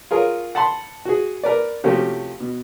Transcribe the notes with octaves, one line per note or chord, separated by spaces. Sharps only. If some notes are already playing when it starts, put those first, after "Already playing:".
F4 G#4 A#4 C#5
F#5 A5 B5 C6
F#4 G#4
A#4 B4 D5
C3 F3 A3 C#4 F#4 G4
B2